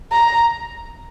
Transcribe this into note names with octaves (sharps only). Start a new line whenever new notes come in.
A#5